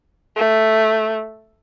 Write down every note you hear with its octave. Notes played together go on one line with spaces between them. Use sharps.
A3